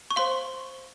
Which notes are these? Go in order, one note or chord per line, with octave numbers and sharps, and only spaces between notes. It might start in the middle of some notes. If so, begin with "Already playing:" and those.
C#6
C5 F5 C6